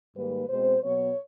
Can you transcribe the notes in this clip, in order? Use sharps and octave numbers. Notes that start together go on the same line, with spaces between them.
G#2 D#3 G3 A#3 B4
B2 G#3 C4 C5
B2 F#3 B3 C#5